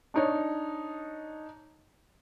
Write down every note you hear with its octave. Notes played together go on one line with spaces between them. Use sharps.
D4 D#4 C#5